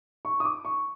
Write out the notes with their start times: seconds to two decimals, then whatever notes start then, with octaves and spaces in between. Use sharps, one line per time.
0.25 C#6
0.40 D#6
0.45 D6
0.65 C#6